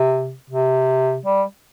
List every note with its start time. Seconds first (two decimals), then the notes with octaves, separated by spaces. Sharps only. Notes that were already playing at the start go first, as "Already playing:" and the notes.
Already playing: C3
0.50 C3
1.26 G3